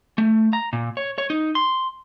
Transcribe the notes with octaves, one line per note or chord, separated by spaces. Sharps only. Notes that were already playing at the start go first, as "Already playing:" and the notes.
A3
A#5
A#2
C#5
C#5
D#4
C6